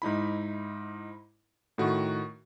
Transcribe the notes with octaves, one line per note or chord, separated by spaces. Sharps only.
G#2 D#4 E4 B5
A2 D#3 F#4